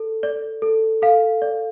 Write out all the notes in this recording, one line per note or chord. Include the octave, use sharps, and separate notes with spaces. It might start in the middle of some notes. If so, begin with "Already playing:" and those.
Already playing: A4
D5
A4
A4 F5
D5